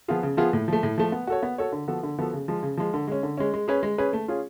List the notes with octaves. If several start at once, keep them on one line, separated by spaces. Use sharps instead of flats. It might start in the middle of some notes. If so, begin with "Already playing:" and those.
F3 B3 F4 G#4
C#3
F3 B3 F4 G#4
A2
F3 A3
A2
F3 A3
B3
F#4 A4 C#5
B3
F#4 A4 C#5
D3
F3 B3 F#4 A4
D3
F3 B3 F#4 A4
C#3
F3 G#3
C#3
F3 G#3
D3
G#3 C#4
D3
G#3 C#4
G#3
C#4 G#4 B4
G#3
C#4 G#4 B4
A3
C#4 F4 G#4